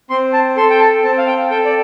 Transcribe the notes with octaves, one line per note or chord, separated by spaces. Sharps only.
C4 C6
A5
A4 C6
G5
A5
C4 A5
F5
G5
A4 G5
D5